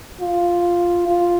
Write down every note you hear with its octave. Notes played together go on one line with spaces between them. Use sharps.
F4
F4